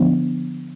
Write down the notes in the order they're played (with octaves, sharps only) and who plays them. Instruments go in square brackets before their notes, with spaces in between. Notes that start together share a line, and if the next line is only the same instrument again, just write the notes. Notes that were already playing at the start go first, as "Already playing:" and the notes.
Already playing: [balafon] D3 F3 B3 D4